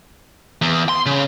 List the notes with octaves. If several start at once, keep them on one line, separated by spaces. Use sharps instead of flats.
E2
C6
C#3